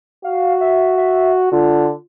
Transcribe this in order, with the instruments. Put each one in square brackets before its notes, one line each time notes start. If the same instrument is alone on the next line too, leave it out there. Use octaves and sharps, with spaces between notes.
[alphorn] F#4 [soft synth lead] F5
[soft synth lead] E5
E5
[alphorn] D3 [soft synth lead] F4